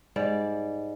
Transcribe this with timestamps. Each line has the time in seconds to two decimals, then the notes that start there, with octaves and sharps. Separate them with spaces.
0.16 G#2 G3 D5